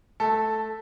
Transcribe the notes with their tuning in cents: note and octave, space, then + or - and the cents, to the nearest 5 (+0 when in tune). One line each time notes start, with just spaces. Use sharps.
A3 -20 A4 +0